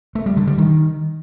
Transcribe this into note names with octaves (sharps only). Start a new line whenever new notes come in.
A3
G3
D3
G3
D#3